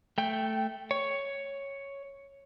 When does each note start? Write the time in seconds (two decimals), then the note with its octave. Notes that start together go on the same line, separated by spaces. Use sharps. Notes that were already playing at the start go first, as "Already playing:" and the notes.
0.18 A3 G5
0.91 C#5